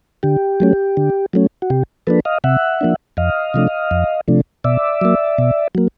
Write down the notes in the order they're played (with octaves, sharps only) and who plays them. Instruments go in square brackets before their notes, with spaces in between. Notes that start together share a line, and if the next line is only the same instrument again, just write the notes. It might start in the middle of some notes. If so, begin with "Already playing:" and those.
[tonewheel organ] D3 G4
F#3 A3 C#4
D3
F#3 A3 C#4
F#4
C3 G4
F3 A#3 D4 A4 B4
D#5 F5
C3 E5 F#5
F3 A#3 D4
F2 D#5 F5
C3 F3 A3 D4
F2
C3 F3 A3 D4
B2 D5 E5
F#3 A#3
B2
F#3 A#3